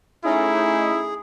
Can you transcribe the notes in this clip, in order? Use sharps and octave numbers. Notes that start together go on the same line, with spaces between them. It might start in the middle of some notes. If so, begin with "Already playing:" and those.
A3 C#4 D#4 E4 G#4